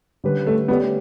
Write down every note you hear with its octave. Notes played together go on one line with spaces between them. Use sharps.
D3 G3 C#4 G4 B4
A3
A3 B3 C#4 G4 B4 D5